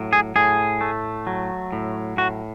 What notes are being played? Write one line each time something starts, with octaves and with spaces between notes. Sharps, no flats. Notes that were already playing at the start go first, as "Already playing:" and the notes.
Already playing: A2 F#3
G#4
A2 G#4
A3
F#3
A2
A2 F#4